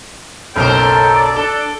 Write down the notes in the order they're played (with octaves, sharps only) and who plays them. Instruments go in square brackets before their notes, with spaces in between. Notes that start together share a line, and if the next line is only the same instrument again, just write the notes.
[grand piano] F#1 B1 [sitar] C#4 A#4 C5 [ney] A4 [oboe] G5
[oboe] D5
[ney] D4 [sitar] A4